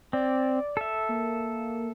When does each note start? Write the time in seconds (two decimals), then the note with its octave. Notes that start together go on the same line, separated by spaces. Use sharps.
0.13 C4 D5
0.77 A4 E5
1.09 A#3